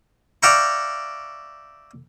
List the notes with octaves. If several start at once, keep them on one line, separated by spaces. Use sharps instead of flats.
D5 E5 F5 G5 A#5 C#6